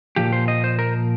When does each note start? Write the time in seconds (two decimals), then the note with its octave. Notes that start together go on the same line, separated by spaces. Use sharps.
0.16 A#2 F3 G4
0.33 C5
0.48 D#5
0.64 C5
0.79 A#4